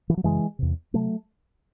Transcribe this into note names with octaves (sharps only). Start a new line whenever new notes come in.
E3
F#3
F#2 C#3 E3 G#3
E2 C3
C3 F#3 A3